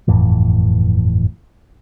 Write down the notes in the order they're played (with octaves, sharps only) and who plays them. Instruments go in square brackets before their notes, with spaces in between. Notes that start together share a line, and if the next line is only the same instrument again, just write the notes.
[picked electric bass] G1 F2 A2 E3